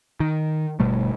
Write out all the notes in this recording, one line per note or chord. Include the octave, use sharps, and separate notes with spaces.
D#3
G1 B2 G3 A3